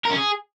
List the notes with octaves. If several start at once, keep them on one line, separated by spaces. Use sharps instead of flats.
A#4
C#4
G#4